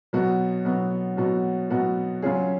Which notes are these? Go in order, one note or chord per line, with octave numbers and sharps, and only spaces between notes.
B2 F#3 B3 F#4
B2 F#3 B3 F#4
B2 F#3 B3 F#4
B2 F#3 B3 F#4
C#3 F#3 C#4 F4 G#4